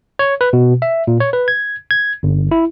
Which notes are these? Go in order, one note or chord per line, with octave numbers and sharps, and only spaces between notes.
C#5
B4
B2
E5
A#2
C#5
B4
G#6
G#6
G1
E4